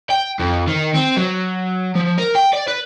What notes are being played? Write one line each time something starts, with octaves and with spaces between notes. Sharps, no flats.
G5
F2
D#3
C4
F#3
F3
A#4
G5
D5
B4